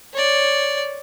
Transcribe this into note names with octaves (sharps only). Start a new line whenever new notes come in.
C#5 D5